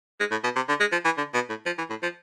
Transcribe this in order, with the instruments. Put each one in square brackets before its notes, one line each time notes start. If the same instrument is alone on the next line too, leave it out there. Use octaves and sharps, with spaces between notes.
[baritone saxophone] G#3
A2
B2
C3
D3
G#3
F3
E3
D3
B2
A2
F3
E3
A2
F3